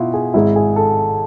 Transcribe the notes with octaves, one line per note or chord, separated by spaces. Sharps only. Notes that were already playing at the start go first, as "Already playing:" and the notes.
Already playing: B2 E4 F4
G#4
G#1 G#2 G#3 E4
G#4
A4